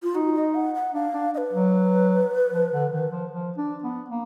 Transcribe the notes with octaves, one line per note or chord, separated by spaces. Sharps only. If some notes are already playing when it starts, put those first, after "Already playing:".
F4
D#4 F#4
D#5
F#5
F#5
D4 F5
D4
D#5
B4
F#3
F3
D3
D#3
F3
F3
D4
B3
A#3